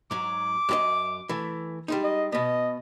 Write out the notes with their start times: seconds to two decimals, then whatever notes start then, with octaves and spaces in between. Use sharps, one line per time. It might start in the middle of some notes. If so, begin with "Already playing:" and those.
0.11 G#2 F#3 D6
0.69 F#2 G4 D#5
1.29 E3 A3
1.88 G3 G#3 D#4
2.04 D#5
2.32 B2 B3 D#5